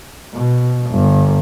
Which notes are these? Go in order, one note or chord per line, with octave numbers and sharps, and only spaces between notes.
B2
G1